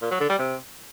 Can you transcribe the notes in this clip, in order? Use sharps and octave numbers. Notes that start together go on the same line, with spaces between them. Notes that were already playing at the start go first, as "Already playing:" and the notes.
A#2
F#3
D3
G3
C3